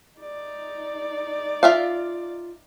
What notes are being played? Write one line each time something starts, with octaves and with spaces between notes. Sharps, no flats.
D#4 D5
F4 E5 F5